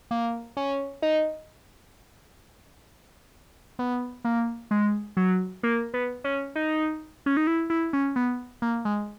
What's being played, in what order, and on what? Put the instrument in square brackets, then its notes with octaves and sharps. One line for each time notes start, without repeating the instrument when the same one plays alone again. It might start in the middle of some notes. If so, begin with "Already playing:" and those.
[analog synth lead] A#3
C#4
D#4
B3
A#3
G#3
F#3
A#3
B3
C#4
D#4
C#4
D#4
E4
E4
C#4
B3
A#3
G#3